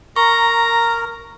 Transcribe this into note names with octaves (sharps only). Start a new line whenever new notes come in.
A#4 A#5 C#6